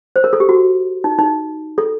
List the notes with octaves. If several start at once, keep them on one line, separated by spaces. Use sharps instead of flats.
C5
A#4
A4
G4
F#4
D#4
D#4
A4